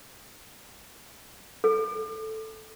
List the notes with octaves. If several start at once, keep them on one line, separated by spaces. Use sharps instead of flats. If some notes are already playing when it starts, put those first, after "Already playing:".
A4